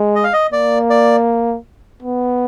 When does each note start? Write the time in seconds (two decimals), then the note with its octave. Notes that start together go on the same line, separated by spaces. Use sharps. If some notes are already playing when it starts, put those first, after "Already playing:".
Already playing: G#3
0.15 D#5
0.24 F5
0.33 D#5
0.52 A#3 D5
0.90 D5
2.02 B3